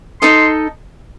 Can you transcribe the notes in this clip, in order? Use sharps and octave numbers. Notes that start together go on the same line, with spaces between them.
D#4 A4 D#5 C6